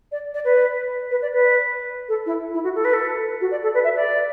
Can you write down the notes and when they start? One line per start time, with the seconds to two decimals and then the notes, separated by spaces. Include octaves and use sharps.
0.12 D5
0.34 D5
0.45 B4
1.11 B4
1.22 D5
1.33 B4
2.09 A4
2.26 E4
2.54 E4
2.64 F#4
2.75 A4
2.85 B4
2.93 A4
3.41 F#4
3.51 D5
3.63 A4
3.74 B4
3.84 E5
3.96 D5